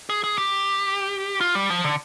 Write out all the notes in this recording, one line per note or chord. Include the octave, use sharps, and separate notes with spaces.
G#4
G#4
G4
F4
G3
F3
D3